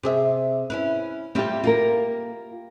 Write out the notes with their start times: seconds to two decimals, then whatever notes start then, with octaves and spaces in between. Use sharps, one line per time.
0.03 C3 G#4 E5
0.70 C#4 E4 B4
1.35 G3 C4 E4 F4 G4
1.64 A#3 F4 G4 A#4